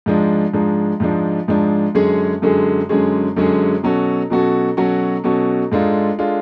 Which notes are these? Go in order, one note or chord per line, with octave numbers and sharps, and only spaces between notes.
G#2 F3 G#3 D4
G#2 F3 G#3 D4
G#2 F3 G#3 D4
G#2 F3 G#3 D4
F#2 D3 G#3 C#4 G#4
F#2 D3 G#3 C#4 G#4
F#2 D3 G#3 C#4 G#4
F#2 D3 G#3 C#4 G#4
B2 F#3 C#4 F#4 A4
B2 F#3 C#4 F#4 A4
B2 F#3 C#4 F#4 A4
B2 F#3 C#4 F#4 A4
G#2 G#3 D4 F4 A4
G#3 D4 F4 A4